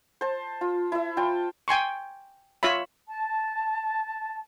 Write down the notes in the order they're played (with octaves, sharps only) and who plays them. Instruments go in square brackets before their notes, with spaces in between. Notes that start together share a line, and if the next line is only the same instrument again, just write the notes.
[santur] C5 A5
F4
E4 E5
F4 G5 A5
[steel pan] G5 G#5 C6 C#6
F4 C#5 E5 B5
[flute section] A5